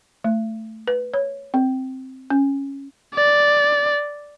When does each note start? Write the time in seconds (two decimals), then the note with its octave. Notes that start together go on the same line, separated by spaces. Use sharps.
0.24 A3
0.87 B4
1.14 C#5
1.54 C4
2.30 C#4
3.14 D5